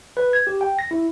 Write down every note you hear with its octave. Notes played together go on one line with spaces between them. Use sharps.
B4
G#6
G4
G5
A#6
E4